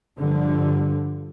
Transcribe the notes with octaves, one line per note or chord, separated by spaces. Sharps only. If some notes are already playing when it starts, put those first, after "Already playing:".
G2 D3 F3